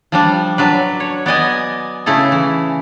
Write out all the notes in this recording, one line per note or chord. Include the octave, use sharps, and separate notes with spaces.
F3 G3 D4
F#3 D4 B4
C#5
B3 D5 D#5 G#5
C#3 A3 E4 G#4 A4
E3